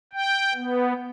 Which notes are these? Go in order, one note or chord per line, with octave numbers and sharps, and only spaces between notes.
G5
B3